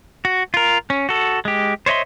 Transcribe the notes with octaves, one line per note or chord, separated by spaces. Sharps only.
F#4
F4 A#4
C#4
F#4 A4
G#3 G4
C5 C#5 D#5 E5 C6